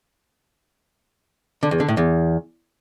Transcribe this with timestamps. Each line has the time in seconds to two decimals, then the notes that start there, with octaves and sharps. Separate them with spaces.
1.63 D3
1.71 E2
1.80 D3
1.88 A2
1.97 E2